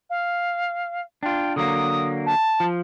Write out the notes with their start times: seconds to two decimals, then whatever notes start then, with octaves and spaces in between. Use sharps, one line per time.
0.10 F5
1.23 D4 F4 G5
1.56 D3 F#3 A#3 D#6
2.26 A5
2.60 F3